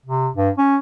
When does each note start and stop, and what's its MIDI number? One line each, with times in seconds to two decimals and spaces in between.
0.06 0.28 48
0.36 0.50 43
0.58 0.77 61